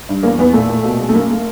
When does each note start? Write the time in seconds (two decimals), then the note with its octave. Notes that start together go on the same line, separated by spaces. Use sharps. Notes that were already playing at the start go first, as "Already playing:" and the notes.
0.09 G2
0.23 E2 A#3
0.39 E2 B3
0.53 A#2 A3
0.69 A#2
0.84 B2
1.00 G#3
1.09 A3
1.14 F#2 A#3
1.30 A3